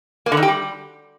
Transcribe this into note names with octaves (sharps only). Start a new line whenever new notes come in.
A#3
D3
D#3
G4
G3